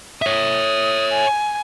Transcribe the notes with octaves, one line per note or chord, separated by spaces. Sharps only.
C#5 E5 D#6
G#5